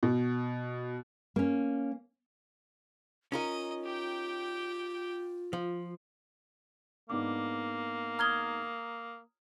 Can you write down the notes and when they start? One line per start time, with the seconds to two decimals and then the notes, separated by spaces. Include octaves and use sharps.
0.03 B2
1.36 A#3 C#4
3.32 C#4 D#4 F4 A#4 D#5
3.84 G4 G5
5.53 F3
7.10 G#2 A#3 B3 D4 D6
8.19 A#5 D#6 F6 G#6 G7